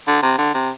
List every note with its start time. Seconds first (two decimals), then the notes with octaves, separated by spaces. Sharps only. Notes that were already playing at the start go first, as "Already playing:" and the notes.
0.08 D3
0.22 C3
0.38 D3
0.54 C3